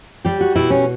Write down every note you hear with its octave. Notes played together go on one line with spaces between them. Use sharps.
G3 G4
F#4
B2 E4
C#4